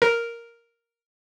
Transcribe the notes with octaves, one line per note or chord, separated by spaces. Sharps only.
A#4